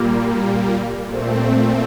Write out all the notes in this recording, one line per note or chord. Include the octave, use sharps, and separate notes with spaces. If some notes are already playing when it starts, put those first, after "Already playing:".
Already playing: A#2 G3 A#3
A#2 A3 C4